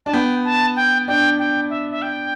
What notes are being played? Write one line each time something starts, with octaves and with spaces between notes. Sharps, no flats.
D4 A5
B3 G5
A5
G5
D4 G5
G5
E5
E5
G5